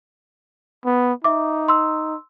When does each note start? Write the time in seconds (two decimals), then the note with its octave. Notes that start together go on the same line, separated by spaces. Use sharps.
0.85 B3
1.24 D#4 E5 D6
1.68 C6 E6